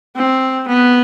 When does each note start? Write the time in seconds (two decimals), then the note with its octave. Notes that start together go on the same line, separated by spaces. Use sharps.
0.16 C4
0.68 B3